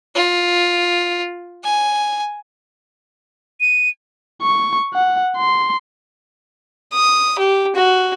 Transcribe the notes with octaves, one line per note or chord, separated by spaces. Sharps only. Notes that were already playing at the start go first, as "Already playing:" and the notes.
F4
G#5
D#7
C#6
F#5
C6
D#6
G4
F#4